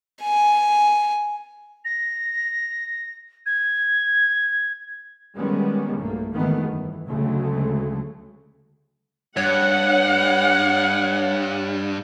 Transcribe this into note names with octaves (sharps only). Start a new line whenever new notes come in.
G#5
A#6
G#6
D#3 G3 G#3 B3 C#4
B1 G2 A3 A#3
G#1 F2 D#3 E3 A3 B3
G1 E3
D2 C#3 F#3 G#3 A3
G2 C#5 F#5